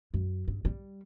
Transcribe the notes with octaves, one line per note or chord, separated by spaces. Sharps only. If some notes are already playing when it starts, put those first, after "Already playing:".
F#2
G2
G3